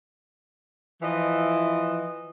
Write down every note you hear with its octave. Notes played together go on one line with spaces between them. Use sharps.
E3 F3 E4 D#5